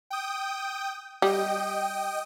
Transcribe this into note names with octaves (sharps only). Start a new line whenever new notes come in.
G5 D#6
G3 D#5 G5 D#6